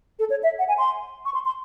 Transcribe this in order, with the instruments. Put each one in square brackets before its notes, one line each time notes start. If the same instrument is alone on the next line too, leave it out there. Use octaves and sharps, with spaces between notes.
[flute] A4
C#5
E5
F#5
G#5
C6
C#6
C6
C6